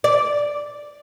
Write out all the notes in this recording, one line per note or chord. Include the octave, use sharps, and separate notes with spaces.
D5